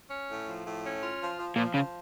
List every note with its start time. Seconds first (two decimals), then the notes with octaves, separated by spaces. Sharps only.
0.11 C#4
0.29 A2
0.47 F3
0.66 A2
0.84 C#4
1.02 F4
1.20 F3
1.38 F3
1.56 A#2 F3
1.74 C#3 F3